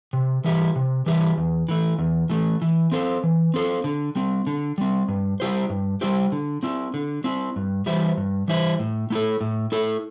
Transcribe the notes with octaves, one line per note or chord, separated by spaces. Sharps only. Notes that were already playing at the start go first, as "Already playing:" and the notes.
C3
E3 G3 E4 G4
C3
E3 G3 E4 G4
E2
E3 A3
E2
E3 A3
E3
C4 A4 C5
E3
C4 A4 C5
D3
G3 C4
D3
G3 C4
G2
G3 E4 G4 C5
G2
G3 E4 G4 C5
D3
C4 E4
D3
C4 E4
G2
E3 G3 E4 C5
G2
E3 G3 E4 C5
A2
A3 E4 A4
A2
A3 E4 A4